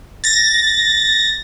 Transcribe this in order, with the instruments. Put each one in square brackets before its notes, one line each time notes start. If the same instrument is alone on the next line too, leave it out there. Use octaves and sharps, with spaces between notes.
[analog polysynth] A6 A#6